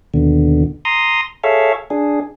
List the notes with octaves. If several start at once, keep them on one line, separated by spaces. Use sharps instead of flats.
D#2 B2 D3
A#5 C6 D#6
G#4 A4 C#5 E5 F5
D4 G#4